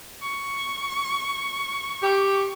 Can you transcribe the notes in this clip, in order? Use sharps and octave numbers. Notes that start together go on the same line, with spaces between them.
C#6
G4